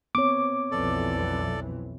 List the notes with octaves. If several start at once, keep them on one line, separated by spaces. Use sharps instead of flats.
B3 C4 C#5 D6
B1 F2 E3 A4 D5